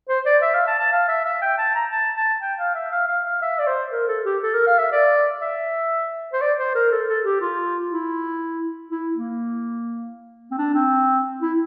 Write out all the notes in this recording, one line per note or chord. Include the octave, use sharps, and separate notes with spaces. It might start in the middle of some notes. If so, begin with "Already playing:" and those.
C5
D5
E5
F5
A5
A5
F5
E5
E5
G5
A5
A#5
A5
A5
G5
F5
E5
F5
F5
F5
E5
D5
C5
A#4
A4
G4
A4
A#4
F5
E5
D5
E5
C5
D5
C5
A#4
A4
A4
G4
F4
E4
E4
A#3
C4
D4
C4
E4